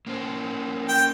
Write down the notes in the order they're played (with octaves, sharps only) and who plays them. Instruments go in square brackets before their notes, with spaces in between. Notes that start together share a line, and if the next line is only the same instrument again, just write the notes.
[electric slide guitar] A#3 C#4 C5
[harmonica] G5